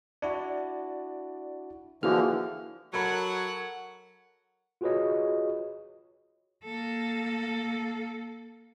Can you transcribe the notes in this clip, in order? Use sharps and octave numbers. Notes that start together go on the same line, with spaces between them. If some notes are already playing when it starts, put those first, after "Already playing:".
D4 E4 F#4 D5
D3 E3 F3 A#3 E4 F#4 G#4 F6
F#3 A4 A#4 C#5 F#5 B5
F4 F#4 G#4 B4 C#5 D#5
A#3 A4